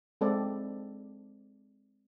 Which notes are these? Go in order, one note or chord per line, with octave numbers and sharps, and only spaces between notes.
G#3 C4 A4 D5